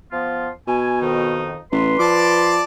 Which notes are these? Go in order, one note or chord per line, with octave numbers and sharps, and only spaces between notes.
F3 B3 F4
B2 G#5
F2 D#3 D#4
A1 B4 C6
F3 D5 A5 D6